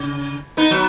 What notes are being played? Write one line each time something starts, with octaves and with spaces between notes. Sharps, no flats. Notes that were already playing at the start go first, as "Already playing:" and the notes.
Already playing: C#3
B3 D#4
F#3 B3